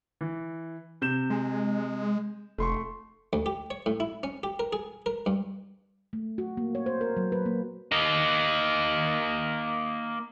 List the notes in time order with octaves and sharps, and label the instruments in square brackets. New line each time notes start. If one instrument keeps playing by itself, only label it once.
[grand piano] E3
C3 G6 E7
[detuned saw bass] G#3
[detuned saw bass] F1 [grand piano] A3 C6 C#6
[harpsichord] D2
G4
C#5
A2
E4
C#4
G4
A#4
G#4
A#4
G2
[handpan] A3
F#4
A#3
C#5
C5
A#4
F#3
B4
A#3
[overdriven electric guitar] A#3 D#4